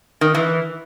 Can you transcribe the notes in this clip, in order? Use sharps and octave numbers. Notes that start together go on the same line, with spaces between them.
D#3
E3